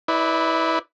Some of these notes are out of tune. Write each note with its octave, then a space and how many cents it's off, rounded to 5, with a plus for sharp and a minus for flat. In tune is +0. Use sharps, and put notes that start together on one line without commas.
E4 -25 B4 +5 D5 +0